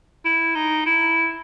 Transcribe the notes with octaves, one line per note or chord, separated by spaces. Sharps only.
E4
D#4
E4